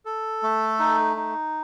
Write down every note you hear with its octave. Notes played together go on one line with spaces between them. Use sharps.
A4
A3
D#4
D#4